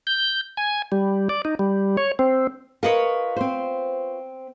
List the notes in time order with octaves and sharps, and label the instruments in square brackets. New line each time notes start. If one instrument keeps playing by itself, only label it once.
[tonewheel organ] G6
G#5
G3
D5
D#4
G3
C#5
C4
[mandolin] F4 B4 C#5 [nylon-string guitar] A#4 D#5
[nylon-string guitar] C4 C5